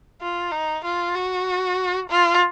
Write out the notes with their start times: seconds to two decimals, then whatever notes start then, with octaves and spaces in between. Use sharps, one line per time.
0.21 F4
0.52 D#4
0.84 F4
1.15 F#4
2.09 F4